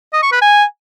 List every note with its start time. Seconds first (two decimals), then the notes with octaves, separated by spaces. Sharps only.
0.13 D#5
0.23 C#6
0.32 B4
0.41 G#5